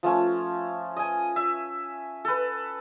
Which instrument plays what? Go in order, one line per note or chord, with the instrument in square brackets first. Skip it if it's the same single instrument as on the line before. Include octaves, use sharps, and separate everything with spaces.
[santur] F3 A3 C#4
D#5 G#5
E5
A4 B4